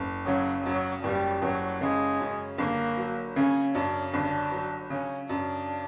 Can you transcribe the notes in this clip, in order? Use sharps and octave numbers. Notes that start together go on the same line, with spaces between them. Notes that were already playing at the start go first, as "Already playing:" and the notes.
Already playing: F#1
C#3 F#3
F#2 F#3
F#1 G3
F#1 F#3
C#3 G#3
F#2
G1 A#3
F#3
C#3 C#4
F#2 D4
G1 D4
F#3
C#3 C#4
F#2 D4